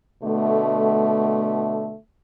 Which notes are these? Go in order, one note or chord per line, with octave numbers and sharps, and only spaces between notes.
B2 D3 A3